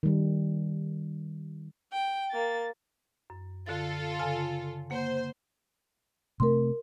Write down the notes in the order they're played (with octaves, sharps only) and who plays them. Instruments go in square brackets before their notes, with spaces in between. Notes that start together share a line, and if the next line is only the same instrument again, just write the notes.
[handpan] D#3 G3
[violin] G5
A#3 A6
[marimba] F#2
[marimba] D3 A6 [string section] F4 A4
[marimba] C#3 G#5 A5
[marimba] A#3 F#5 [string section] C5
[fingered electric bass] C3 A3 C4 [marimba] A#4 C6